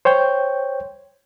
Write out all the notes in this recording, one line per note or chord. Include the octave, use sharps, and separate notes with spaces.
C5 C#5 G5 G6